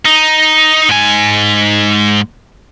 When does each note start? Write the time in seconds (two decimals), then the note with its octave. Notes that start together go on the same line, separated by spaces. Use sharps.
0.05 D#4
0.89 G#2 G#5